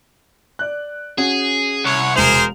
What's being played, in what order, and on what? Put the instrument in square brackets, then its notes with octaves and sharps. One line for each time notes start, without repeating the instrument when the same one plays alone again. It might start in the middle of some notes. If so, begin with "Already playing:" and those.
[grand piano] D5 F#6
[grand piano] C#4 F#4 [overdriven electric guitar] G#4
[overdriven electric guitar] C2 [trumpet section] C#5 F#5
[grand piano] E1 F7 [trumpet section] G#4 A#4 C5